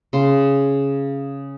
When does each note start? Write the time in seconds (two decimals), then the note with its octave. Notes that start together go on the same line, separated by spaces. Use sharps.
0.13 C#3 C6